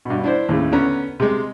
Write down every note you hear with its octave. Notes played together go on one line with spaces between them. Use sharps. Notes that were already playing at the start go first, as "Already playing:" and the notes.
G2 B2
D4 E4 C5
D#2 A2 C#3
D3 B3 C#4 A#5
C3 G#3